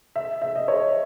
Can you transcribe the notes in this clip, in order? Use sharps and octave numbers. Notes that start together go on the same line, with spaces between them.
E5
E5
D#5
C#5